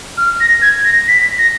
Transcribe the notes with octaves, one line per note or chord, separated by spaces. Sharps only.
F6
A#6
G#6
A#6
B6
A#6